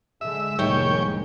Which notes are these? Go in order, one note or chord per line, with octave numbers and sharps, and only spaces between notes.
D3 G#3 E5
F1 A2 D#3 G3 G#3 A#3 C#5 G5